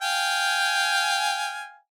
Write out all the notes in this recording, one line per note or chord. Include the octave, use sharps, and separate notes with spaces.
F5 G5 G#5